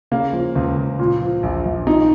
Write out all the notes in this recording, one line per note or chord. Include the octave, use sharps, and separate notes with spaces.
C#3 A#3
F3
C#2
C#2
A#2
F3
A#1
A#1
A#2 D#4